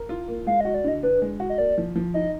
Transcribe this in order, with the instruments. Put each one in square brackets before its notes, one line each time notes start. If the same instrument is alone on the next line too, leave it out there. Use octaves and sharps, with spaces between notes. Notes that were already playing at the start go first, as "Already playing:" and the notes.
Already playing: [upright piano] A#4
F4
A#3
[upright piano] G#3 [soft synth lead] F5
[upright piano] F#4 [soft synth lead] D#5
[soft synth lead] D5
[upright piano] D3 [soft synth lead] D#5
[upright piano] D4 [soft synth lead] B4
[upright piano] G#3
F#4
[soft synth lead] D#5
[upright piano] A#3 [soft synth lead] D5
[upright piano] F3
F3
[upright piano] D#4 [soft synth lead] D#5